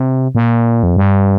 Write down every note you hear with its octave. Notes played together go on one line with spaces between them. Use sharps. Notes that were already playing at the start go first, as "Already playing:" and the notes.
Already playing: C3
A#2
F2
G2